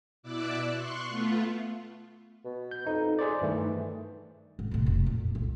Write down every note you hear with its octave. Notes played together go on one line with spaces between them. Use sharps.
B2 E4 D5 D6 E6 F#6
C6 C#6 F#6
A3 B3 F4
B2
G6
F2 D#4
G#4 C5 D5
G2 D#3 E3 A3
G#2
A2 C3
F1
A#2
C#2